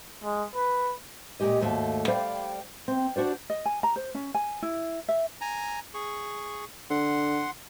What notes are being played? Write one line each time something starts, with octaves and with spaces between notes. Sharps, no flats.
G#3
B4
A#2 F#3 G#3 G4 D#5
D#2 G#2 A3 F#4 F5
G3 C5 D5 F5 G5
C4
D4 F#4 C5 D5
D#5
G#5
A#5
C5
C#4
G#5
E4
E5
G#5 A#5
G#4 C#6
D3 F#5 C6